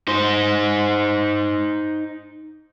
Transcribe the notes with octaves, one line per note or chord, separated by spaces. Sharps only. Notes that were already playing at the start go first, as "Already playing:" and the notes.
D#4 C5